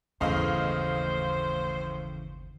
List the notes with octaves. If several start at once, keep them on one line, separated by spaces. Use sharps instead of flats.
G1 D#2 A2 C#3 E3 C5 D#5 F5